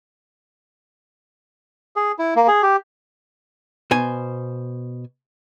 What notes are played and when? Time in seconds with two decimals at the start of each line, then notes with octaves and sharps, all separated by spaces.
1.96 G#4
2.19 E4
2.36 A#3
2.48 G#4
2.63 G4
3.91 B2 C5 G#5